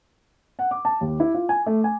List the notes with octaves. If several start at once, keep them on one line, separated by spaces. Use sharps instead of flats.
F#5
D6
A5
D#2
E4
F4
G#5
A3
G#5